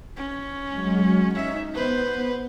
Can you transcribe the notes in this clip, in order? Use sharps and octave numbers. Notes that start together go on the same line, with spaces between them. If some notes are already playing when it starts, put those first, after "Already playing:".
C#4
F#3 G#3
C#4 D#4 E5
B3 B4 C5